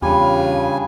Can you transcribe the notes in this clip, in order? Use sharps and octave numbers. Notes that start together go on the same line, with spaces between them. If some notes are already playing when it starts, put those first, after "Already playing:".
E2 C#3 G3 D4 F4 G#5